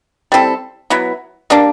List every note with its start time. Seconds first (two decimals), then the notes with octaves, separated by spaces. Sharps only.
0.32 G3 C4 E4 A4
0.90 F#3 B3 E4
1.50 G3 A#3 D4